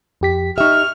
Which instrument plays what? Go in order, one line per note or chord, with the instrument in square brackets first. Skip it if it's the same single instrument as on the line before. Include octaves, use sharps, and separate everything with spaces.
[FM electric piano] F2 G4 B6
[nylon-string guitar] D#4 E5 [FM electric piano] G4 C#6 [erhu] F6